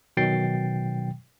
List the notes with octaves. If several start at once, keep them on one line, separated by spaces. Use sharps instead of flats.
B2 D#3 F#3 G5 A6 C7